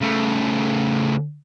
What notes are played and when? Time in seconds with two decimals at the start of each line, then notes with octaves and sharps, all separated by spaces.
0.01 C#3 A3